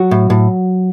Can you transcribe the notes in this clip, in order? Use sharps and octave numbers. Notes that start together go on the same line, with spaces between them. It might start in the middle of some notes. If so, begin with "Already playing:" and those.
Already playing: F#3 F#4
A2
A2